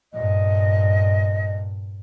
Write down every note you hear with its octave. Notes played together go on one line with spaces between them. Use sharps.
G2 A#2 D#5